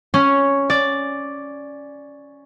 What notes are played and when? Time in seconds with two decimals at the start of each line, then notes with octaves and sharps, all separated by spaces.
0.14 C#4
0.70 D5